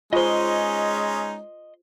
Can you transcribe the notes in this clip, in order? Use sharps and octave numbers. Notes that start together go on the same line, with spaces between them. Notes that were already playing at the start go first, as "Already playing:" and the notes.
G#3 C#4 D#4 F4 G#4 C5 D#5 C6